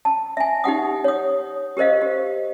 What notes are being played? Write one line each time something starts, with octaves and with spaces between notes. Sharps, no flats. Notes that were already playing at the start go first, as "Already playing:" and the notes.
A5
E5 G#5
D#4 G4 F#5 D#6
C#5 D#6
G4 A#4 C5 D#5 F5
G4